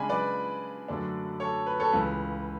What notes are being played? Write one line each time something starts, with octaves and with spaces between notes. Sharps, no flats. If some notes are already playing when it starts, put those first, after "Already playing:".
Already playing: C#3 G#3 D4 G#5 B5
B4 D5
F#2 D3 A3 D4
A4 C#5
B4
A4 C#5
C#2 C#3 E3 B4